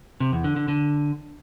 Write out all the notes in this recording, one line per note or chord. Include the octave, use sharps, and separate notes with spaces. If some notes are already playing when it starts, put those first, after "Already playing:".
C3
E2
D3
D3
D3